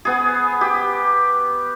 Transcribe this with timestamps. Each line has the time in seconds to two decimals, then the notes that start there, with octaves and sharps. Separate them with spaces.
0.05 B3 G#4
0.61 G4